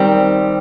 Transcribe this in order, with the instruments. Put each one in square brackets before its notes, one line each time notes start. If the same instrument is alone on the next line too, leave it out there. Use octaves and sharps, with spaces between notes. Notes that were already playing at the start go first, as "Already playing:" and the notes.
Already playing: [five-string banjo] D#3 G3 C4